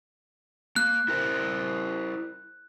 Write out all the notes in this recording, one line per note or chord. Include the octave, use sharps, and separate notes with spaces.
A#3 F#6
E4 A#4 C5